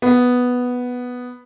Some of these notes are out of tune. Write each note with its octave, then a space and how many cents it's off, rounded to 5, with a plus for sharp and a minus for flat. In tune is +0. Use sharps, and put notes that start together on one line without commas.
B3 +0